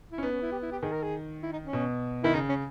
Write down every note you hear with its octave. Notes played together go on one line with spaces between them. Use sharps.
E4
C#4
B3 D#4
C#4
E4
G4
E4
G4
D#3 G#4
A#4
G#4
E4
D#4
C#4
B2
D#3 E4
C#3 D#4
C#4